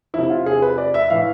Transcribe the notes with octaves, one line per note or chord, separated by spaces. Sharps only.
C3 F3 E4
F4
G#4
B4
D5
E5
A2 E3 F5